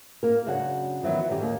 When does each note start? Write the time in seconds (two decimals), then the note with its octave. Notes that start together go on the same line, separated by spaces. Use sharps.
0.23 A#3 A#4
0.46 F#2 C#3 D4 F#4 C#5 F#5
1.03 D#3 E3 F#3 B3
1.28 F#2 D3 D#3 C#4 G4
1.42 D#2 A#3